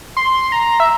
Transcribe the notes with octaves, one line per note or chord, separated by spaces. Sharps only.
C6
A#5
E5